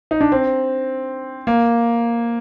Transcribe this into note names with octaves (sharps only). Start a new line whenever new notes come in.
D#4
D4
C4
A#3